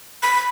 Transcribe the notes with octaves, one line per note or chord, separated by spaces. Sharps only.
B5